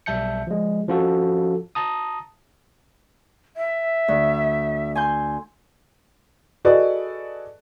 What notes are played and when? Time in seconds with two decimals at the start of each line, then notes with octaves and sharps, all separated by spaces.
0.06 B1 G3 E5 A5 G6 C#7
0.47 F3 G#3
0.88 F3 C#4 F4 F#4 A4
1.75 A5 A#5 D#6
3.56 E5
4.08 D2
4.95 G#5 C6 G6
6.65 F#4 G#4 A4 B4 D5 D#5